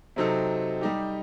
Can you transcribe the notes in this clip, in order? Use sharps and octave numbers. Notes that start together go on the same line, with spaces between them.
C3 F#3 C4 D#4 A4
G3 D#4 G4